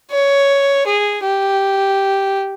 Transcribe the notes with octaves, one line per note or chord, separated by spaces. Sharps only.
C#5
G#4
G4